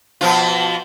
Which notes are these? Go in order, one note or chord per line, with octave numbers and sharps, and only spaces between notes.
B2 F3 F4